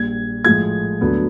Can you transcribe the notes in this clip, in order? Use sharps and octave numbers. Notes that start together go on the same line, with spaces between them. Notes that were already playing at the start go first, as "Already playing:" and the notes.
Already playing: A#1 A#2 G3 G#6
A2 F3 G#3 G#6
D2 D3 F#3 B3